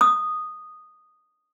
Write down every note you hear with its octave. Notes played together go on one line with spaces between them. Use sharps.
D#6